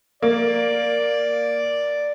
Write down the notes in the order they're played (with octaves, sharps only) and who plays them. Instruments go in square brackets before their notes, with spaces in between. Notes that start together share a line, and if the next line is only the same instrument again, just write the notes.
[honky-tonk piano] A#3 [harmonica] D5